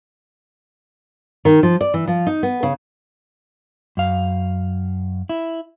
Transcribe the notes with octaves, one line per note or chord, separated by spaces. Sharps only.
D#3
F3
D5
E3
F3
D#4
B3
C#3
F#2 F5
E4